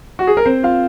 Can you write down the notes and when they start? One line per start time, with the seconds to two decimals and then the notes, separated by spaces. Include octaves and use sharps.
0.19 F#4
0.27 G#4
0.37 A#4
0.45 C4 C5
0.63 F4 F5